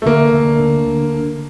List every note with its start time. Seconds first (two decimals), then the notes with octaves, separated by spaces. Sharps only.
0.02 A3
0.06 D2 A#3
0.33 D2
0.59 D3